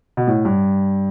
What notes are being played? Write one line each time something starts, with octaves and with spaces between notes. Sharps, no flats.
B2
A2
G2